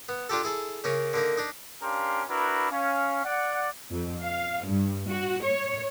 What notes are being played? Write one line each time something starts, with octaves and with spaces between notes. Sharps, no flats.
B3
D4 F4 G4 A4
E4 G#4 A4
C#3 A#3 C#4
D3 A#3 D#4
D4 D#4
C#4 D4 G4 A#4 F5 C6
D4 E4 F#4 A#4 B4
C#4 F5
D5 F#5
F2
F5
G2
F#4
C#5